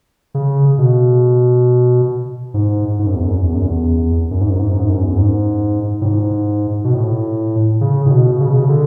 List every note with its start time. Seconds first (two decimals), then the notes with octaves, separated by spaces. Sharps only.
0.34 C#3
0.78 B2
2.54 G#2
2.99 G#2
3.07 F#2
3.15 E2
3.23 F#2
3.43 E2
3.54 F#2
3.66 E2
4.31 F#2
4.41 G#2
4.50 F#2
4.60 G#2
4.70 F#2
4.80 G#2
4.89 F#2
5.03 E2
5.10 F#2
5.18 G#2
6.02 A2
6.05 G#2
6.84 B2
6.94 A2
7.81 C#3
8.06 A2
8.10 B2
8.41 C#3
8.49 B2
8.57 C#3
8.69 D3